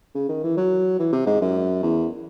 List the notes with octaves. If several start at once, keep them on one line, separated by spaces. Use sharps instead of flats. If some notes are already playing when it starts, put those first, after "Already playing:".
C#3
D#3
E3
F#3
E3
C3
G#2
F#2
E2